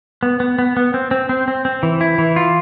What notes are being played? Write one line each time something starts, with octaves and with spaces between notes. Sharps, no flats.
B3
B3
B3
B3
C4
C4
C4
C4
C4
E3
E4
E3
F4